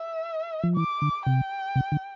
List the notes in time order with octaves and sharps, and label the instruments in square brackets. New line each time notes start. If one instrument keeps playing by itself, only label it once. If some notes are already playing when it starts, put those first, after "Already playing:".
Already playing: [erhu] E5
[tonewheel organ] F3
[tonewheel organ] E3 [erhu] D6
[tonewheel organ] D3
[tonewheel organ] C3 [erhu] G5
[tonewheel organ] C3
D3